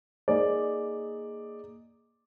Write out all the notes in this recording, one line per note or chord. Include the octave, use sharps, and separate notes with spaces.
A#3 D#4 G#4 D5